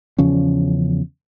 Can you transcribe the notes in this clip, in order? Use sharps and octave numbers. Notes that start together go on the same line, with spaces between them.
E2 C#3 F3 C#4